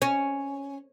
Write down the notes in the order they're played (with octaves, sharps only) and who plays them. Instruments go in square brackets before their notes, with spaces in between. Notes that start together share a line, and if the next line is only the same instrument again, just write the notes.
[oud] C#4